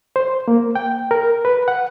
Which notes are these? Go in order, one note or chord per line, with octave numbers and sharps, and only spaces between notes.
C5
A#3
G5
A#4
B4
F#5